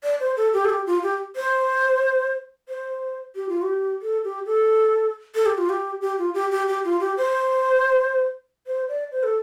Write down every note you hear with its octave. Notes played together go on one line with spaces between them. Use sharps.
D5
C5
A4
G4
A4
G4
F4
G4
C5
C5
G4
F4
G4
A4
G4
A4
A4
G4
F4
G4
G4
F4
G4
G4
G4
F4
G4
C5
C5
D5
C5
A4